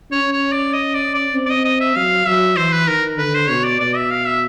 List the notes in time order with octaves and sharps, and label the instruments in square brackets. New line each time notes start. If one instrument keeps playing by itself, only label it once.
[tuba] C#4 [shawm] C#5
[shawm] C#5
D5
D#5
D5
D5
[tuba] C4
[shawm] D5
D#5
D#5
E5
[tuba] F#3 [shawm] F5
[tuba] F#3 [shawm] E5
[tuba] E3 [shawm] C5
[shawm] B4
[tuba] D#3 [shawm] A#4
[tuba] D3 [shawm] B4
[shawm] C5
[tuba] B2 [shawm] C#5
[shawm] D5
[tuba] B2 [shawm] D5
[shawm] E5
F5
E5